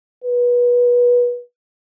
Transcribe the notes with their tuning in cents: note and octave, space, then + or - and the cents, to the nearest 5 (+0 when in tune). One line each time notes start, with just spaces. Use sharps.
B4 -25